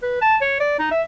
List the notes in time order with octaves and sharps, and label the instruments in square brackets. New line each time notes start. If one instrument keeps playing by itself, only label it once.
[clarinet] B4
A5
C#5
D5
D#4
E5